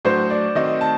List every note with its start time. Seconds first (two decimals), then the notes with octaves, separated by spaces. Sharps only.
0.05 A2 F#3 A3 D4 F#4 C5
0.30 D5
0.55 D#3 A3 C4 F#4 D#5
0.81 A5